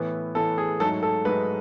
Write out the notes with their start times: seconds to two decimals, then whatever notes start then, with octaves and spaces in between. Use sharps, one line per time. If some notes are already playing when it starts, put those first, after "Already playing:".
Already playing: A2 E3 B3 E4
0.35 A2 E3 B3 E4 A4
0.58 G#4
0.80 G#2 F#3 A3 D#4 A4
1.03 A4
1.25 G#2 F#3 A3 D#4 B4